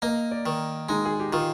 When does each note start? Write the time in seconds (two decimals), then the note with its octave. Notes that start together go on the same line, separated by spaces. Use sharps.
0.02 A#3 D#5
0.31 D5
0.46 D#3
0.89 G#3 D#4
1.05 G#4
1.20 G4
1.33 D#3 F4